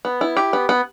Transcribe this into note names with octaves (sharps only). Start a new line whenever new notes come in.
B3
E4
G4
B3
B3